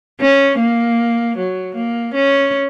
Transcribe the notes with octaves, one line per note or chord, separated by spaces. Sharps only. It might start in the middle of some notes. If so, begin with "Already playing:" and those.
C#4
A#3
F#3
A#3
C#4